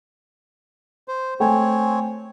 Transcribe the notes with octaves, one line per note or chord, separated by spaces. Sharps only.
C5
A3 C4 C#5 G5 G#5